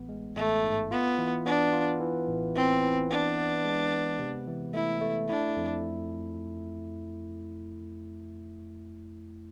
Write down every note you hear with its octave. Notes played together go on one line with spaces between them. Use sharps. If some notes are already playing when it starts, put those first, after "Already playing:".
Already playing: A1 B3
G#3
A1 A3
G#2
B3 F4
E3
B3 D4
F4
E3
A1
E3 C4
E3
B3 D4
B3
G#3
B3
C3
E3
A3 E4
A3
D4 E4
F2